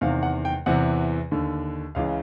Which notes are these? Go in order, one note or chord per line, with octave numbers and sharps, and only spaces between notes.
E2 C3 D#3 F5
F#5
G5
E2 C3 E3 F#5
D#2 D3
C#2 C#3 E3 F5